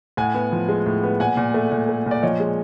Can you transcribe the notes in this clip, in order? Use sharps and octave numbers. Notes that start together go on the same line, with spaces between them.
A2 F#5 G#5
B3
F3
G#3
A2
B3
A#2 F#5 G#5
A#2
A3
A#2
A3
A#2 D5
F3 C#5 D#5
G#3